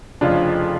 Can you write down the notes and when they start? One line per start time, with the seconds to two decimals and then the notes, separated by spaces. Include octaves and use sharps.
0.21 F1 F2 C#3 F3 D4 F4